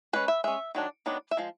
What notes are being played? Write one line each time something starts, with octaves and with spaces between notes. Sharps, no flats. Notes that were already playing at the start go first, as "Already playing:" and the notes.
G#3 C#4 B4
E5
G#3 C#4 E5
D#3 F#3 D4
D#3 F#3 B3 D4
E5
F3 G#3